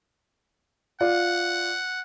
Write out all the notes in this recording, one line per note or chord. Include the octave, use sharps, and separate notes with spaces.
F4 D5 F#5